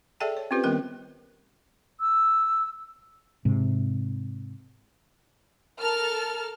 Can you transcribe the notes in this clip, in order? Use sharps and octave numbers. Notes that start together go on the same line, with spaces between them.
G#4 A4 D5 E5 G5 A5
C#5
C4 C#4 F4 G4 B4 C5
D#3 G3 B3 A#4 G5
E6
G#2 C3
A4 A#4 A5 F6